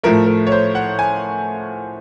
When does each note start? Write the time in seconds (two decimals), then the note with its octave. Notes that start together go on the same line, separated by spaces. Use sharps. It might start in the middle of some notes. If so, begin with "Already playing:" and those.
0.03 A2 F3 A3 A#4
0.27 A#4
0.47 C#5
0.52 C5
0.75 F#5
0.99 G#5